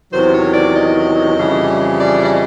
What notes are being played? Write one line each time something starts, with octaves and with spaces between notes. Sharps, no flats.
E2 C3 D#3 F#3 C5
C#5
D5
D#5
F2 C#3 E3 G3
D5
D5
D#5